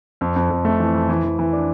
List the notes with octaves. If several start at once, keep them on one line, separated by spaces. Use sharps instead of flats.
F2
F2
F2
A3
E3
F2
E3
E3
E3
D4